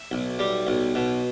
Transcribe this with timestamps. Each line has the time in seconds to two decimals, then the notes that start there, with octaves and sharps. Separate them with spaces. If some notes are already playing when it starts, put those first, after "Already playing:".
Already playing: E5
0.11 B1
0.39 G3
0.67 B1
0.95 B2